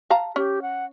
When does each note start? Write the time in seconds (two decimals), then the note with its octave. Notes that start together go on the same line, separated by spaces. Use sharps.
0.10 F5 A5 A#5
0.36 C#4 G4
0.62 F#5